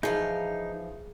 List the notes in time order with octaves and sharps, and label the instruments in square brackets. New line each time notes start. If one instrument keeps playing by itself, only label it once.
[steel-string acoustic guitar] E3 F3 F5 [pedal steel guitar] D#4 [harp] G#4